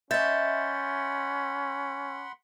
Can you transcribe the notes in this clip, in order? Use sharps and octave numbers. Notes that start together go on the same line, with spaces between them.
C#4 D#5 E5 F#5 B5 C6 G6 A6